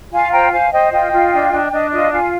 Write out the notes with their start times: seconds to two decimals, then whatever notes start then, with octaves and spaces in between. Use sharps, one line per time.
0.11 F4 F5 G#5
0.32 C5 G5 A#5
0.52 C5 F5 G#5
0.72 C5 D#5 G5
0.91 F4 D#5 G5
1.12 F4
1.32 D4
1.52 D4
1.71 D4 D#5
1.91 F4 D#5
2.11 F4 F5 G#5